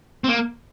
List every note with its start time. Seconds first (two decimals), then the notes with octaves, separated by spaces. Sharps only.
0.24 C4
0.29 A#3